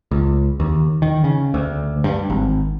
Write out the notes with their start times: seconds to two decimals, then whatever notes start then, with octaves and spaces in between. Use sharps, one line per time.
0.11 C#2
0.60 D#2
1.02 D#3
1.24 C#3
1.54 D2
2.04 G2
2.30 G#1